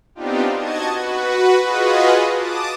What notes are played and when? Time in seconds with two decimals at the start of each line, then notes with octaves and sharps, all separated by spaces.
0.15 B3 C4 D4 D#4 F4 G4
0.55 F#4 D#5 A5 G#6
0.95 F#4 B4
1.63 F4 F#4 G#4 B4 D#5
2.32 A5 D6 D#6